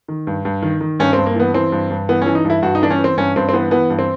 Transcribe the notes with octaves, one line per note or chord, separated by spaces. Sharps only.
D#3
G2
G2
D#3
D#3
G2 C#4
C4
G2
A#3
E3 B3
E3 C4
G2
G2
E3 B3
C#4
E3
D#4
G2
E4
G2 F#4
D#4
E3 D4
C#4
E3
C4
G2 C#4
G2 C4
C4
E3 B3
E3 B3
G2
C4